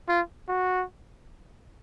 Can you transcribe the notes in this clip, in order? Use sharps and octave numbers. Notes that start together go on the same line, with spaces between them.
F4
F#4